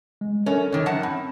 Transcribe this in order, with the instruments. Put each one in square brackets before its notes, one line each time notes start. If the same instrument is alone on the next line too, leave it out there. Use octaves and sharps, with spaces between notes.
[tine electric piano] G#3
[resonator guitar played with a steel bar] F#2 C#4 [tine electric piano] A4 A#4 C#5
[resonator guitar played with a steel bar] D3 D#3 [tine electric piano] C#5
[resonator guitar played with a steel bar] F#2 F#5 A5
[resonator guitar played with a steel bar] C4 [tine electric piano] B5